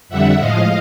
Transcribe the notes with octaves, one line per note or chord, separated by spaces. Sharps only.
F2 D3 G3 E5 F#5
A2 F3 G#3 D#5 F5